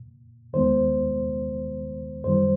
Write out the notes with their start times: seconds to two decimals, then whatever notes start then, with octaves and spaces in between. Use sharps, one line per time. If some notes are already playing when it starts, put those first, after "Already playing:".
Already playing: A#2
0.53 D#2 D#3 G#3 B3 C5
2.24 F#2 D#3 G3 C5